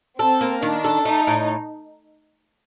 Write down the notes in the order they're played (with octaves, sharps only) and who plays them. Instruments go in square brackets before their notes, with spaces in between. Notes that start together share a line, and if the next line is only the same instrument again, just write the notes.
[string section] C4 [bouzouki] A4
[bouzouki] A#3
[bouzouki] D#3 [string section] D4
[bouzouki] A4
[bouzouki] A3 [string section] D#4
[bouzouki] A2